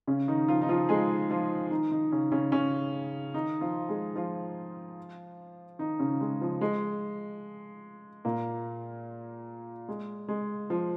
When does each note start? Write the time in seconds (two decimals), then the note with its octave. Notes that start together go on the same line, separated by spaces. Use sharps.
0.07 C#3 C#4
0.28 D#3 D#4
0.48 F3 F4
0.61 D#4
0.69 F3 F4
0.89 G#3 G#4
1.30 F3 F4
1.71 D#3 D#4
1.91 D#3 D#4
2.12 C#3 C#4
2.32 C#3 C#4
2.52 C#3 C#4
3.34 D#3 D#4
3.61 F3 F4
3.89 G#3 G#4
4.16 F3 F4
5.79 D#3 D#4
5.99 C#3 C#4
6.21 G#3
6.41 F3
6.61 G#3
8.25 A#2 A#3
9.88 G#3
10.28 G#3
10.70 F3